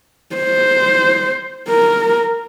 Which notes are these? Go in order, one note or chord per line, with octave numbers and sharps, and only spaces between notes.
C5
A#4